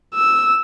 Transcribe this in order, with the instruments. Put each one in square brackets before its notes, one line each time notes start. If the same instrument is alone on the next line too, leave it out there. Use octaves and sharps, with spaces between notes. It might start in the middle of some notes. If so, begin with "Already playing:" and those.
[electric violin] E6